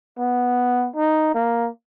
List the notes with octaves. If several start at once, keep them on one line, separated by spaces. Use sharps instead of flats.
B3
D#4
A#3